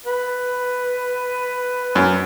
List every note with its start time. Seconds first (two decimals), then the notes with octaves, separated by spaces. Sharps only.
0.06 B4
1.95 F#2